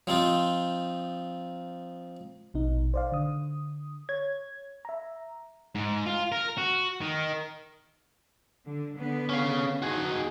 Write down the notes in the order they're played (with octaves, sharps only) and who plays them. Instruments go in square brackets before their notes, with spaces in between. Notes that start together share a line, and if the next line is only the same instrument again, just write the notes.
[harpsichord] F3 C4 D#4 F4
[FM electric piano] A#1 B2 D#4
C5 D5 F5
D3 D#6
C#5 G#6
E5 A#5
[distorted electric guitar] G#2
F4
A#4
F#4
D#3
[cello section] D3
D3 B3
[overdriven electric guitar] C#4 F5
[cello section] D#4 [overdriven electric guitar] F#4 G#4